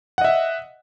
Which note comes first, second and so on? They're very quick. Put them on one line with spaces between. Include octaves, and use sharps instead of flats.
F#5 D#5 E5